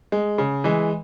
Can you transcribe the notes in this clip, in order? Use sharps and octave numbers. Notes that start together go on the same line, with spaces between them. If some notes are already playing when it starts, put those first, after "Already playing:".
G#3
C#3
E3 G#3